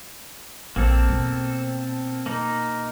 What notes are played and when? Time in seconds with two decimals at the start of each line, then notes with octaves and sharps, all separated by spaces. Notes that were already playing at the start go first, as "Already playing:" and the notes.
0.76 A#1 A#3 C4 A4
1.09 B2
2.26 A#3 D#4